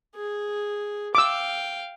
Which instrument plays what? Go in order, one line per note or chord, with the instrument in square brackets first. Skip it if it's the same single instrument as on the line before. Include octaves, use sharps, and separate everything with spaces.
[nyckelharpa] G#4
[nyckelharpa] F5 G5 [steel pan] D6 E6